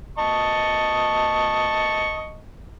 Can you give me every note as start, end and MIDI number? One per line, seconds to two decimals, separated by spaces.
0.19 2.39 75
0.19 2.39 81
0.19 2.39 85